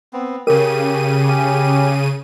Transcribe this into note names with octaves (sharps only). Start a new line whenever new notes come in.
B3 C4
C#3 G4 A#4 D#7
C#4 G4